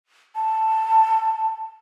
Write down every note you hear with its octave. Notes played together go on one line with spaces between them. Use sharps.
A5